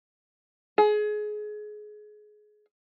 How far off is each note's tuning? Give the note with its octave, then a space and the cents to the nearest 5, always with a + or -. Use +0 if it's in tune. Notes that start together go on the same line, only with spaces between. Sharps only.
G#4 +25